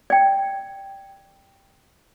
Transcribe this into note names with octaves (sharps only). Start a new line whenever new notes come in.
D5 G5